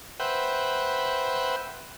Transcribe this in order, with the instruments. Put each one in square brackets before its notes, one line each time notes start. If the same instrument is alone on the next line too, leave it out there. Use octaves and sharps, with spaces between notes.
[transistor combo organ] B4 C5 E5 F#5 G5